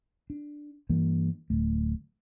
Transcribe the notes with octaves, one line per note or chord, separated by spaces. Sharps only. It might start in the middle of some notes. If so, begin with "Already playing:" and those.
D4
G2 E3 A#3
D1 A3